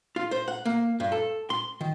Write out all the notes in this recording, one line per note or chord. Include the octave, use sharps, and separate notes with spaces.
F4
C5
F#5
A#3
G2
A4
C6
D#3